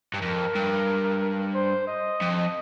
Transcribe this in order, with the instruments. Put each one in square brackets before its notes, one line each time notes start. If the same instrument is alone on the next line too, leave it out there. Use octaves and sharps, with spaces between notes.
[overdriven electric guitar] G2
[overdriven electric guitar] F2 [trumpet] A#4
[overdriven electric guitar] G2
[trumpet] C5
D#5
[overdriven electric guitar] F2